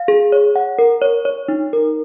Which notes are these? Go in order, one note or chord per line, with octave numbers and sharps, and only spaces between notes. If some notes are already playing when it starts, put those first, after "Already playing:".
Already playing: F5
G#4
C#5
F#5
A#4
C#5
C#5
D#4
A#4